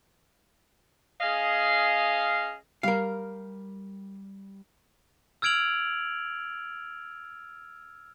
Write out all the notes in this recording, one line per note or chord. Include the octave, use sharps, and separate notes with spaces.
C#4 G#4 D#5 F5
G3 A#4 F5
E6 F6 G#6 D7 F7 F#7